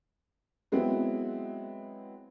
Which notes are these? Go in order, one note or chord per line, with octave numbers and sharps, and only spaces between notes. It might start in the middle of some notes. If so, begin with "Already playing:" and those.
F#3 G#3 B3 C4 E4